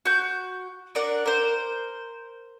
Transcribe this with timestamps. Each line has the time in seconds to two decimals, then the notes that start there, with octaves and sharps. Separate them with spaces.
0.05 F#4 G6
0.95 D4 A#4 D5 F#5
1.26 A#4 C5